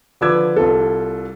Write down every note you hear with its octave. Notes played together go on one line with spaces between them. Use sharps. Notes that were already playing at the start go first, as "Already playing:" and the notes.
D3 F3 B4 D6 E6 G#6
C2 F4 A4